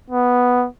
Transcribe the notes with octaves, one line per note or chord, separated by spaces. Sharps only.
B3